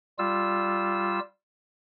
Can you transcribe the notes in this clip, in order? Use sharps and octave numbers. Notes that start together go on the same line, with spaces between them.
G3 F4 E6